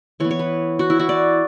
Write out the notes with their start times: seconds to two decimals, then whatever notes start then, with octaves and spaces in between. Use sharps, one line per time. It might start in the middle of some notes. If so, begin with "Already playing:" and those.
0.20 E3 B3 C#5
0.31 C#5
0.39 B4
0.79 F#4
0.90 E4
0.99 F#4
1.09 D5